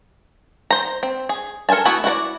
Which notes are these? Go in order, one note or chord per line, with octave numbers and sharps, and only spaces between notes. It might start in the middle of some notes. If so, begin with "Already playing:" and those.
C5 A#5
C4
G#4
A4 A#4 C5 G#5 A5
A3 B3 E4 F#4 A4
E4 F#4 A#4 D5